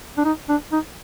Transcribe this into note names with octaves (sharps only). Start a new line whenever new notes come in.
D4
D#4
D4
D#4